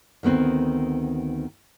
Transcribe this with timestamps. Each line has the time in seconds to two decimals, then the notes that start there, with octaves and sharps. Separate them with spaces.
0.23 D2 D#3 B3 C4